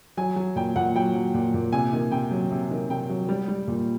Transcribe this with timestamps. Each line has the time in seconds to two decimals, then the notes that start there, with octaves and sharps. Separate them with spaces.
0.17 F#3 G#5
0.36 F#3
0.56 A#2 G5
0.76 A#2 F#5
0.95 F#3 G5
1.15 F#3
1.34 A#2
1.54 A#2
1.73 C3 G#5
1.93 D#3
2.12 C3 G5
2.31 F#3
2.51 C3
2.71 D#3
2.89 C3 G5
3.09 F#3
3.29 G3
3.48 G3
3.68 A#2